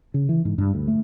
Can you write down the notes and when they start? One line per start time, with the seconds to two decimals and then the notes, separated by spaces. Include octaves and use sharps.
0.14 C#3
0.29 E3
0.45 G#2
0.58 G2
0.74 D2
0.88 A3